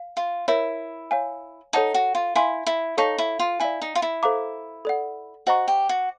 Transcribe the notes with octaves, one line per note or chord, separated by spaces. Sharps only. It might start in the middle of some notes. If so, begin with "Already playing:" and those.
Already playing: F5
F4
E4 A#4 C#5 E5
C#5 F5 G#5
D#4 A4 C#5 F#5 A5
F#4
F4
E4 F5 G#5 C6
E4
D#4 A4 C#5 F5 A5 C#6
E4
F4
E4 D5 F5 G#5
D#4
F4
E4
A4 C5 F5 A#5 D6
A4 D5 F#5
F#4 C5 D#5 F#5 A#5 C#6
G4
F#4